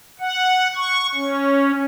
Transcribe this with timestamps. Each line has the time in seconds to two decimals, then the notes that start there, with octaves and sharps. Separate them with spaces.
0.20 F#5
0.75 C#6
1.15 C#4